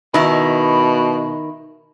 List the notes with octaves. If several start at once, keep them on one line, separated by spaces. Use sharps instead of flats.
B2 D#3 E4